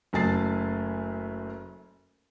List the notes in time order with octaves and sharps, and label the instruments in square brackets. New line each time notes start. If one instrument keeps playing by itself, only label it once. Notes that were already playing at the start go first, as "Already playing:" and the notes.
[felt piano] F#1 F#2 A3 G#5 A6 C7